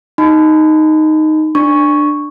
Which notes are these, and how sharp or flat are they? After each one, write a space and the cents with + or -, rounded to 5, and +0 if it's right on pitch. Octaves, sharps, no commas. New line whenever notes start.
D#4 +0 B5 +40
D4 +15 C#6 +0